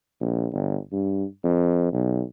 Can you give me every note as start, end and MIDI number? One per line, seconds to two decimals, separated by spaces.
0.21 0.46 34
0.52 0.77 31
0.92 1.24 43
1.44 1.93 41
1.93 2.22 35